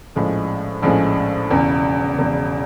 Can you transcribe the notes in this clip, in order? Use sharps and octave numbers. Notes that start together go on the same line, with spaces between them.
A#1 A2 F3 G#3 C#4
A#1 A2 F3 G#3 C#4
E1 E2 C#3
E1 E2 C#3